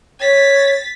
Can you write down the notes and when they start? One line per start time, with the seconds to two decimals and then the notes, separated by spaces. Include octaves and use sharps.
0.21 C#5 A6 B6